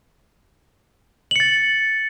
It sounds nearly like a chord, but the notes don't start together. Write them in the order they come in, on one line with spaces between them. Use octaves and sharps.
F#7 C#7 A6